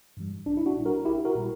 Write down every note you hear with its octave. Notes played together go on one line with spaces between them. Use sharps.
G2 E3 G3
A#1 D4
E4
D4 F#4
A#2 G3
F#4 A#4
A#1 E4 G4
F#4 A#4
A#2 G3